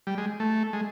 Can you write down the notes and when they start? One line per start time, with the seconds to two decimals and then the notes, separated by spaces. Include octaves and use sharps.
0.07 G3
0.18 G#3
0.40 A3
0.73 G#3